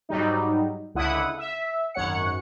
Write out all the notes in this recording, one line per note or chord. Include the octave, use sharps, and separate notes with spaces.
G#2 F#3 G3 D#4
C#2 D3 E4 F#5 D#6
E5
G#1 F#2 C#5 F#5 C#7